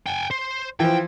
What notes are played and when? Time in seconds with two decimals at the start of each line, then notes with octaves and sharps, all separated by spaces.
0.06 G5 G#5
0.31 C5
0.80 E3 F3 G5